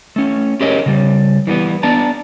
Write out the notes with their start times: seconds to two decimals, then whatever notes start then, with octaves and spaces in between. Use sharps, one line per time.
0.16 A3 C#4
0.61 C#4 G4 G#4 A#4 C#5 D#5
0.86 C#3 G3
1.47 E3 G3 A3 B3
1.83 B3 D4 D5 A5 A#5